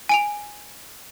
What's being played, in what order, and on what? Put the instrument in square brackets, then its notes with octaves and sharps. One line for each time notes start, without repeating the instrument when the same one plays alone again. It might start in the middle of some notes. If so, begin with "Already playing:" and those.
[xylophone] G#5 D7 F7